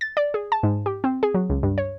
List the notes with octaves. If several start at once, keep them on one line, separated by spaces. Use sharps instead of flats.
A6
D5
G#4
A5
G#2
G4
C4
G#4
F#3
C#2
G2
C#5